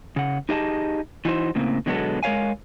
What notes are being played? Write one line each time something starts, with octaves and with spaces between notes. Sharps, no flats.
C#3 F#5
D#4 G4 G#4 D#5 G#5 A5
E3 D#4 E4 F#4 C5
A2 C#3 A#3 C4
B2 D3 F#3 G#3 B3 A4
G#3 A#4 C#5 F5 G#5